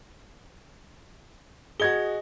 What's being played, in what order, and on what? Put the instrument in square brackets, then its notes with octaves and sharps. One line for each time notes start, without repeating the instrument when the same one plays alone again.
[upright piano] F#4 G#6 G7 [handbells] G#4 D#5